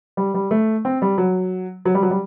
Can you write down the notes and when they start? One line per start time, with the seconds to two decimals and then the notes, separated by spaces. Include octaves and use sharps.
0.17 G3
0.34 G3
0.51 A3
0.85 C4
1.02 G3
1.18 F#3
1.85 F#3
1.95 G3
2.03 F#3
2.11 G3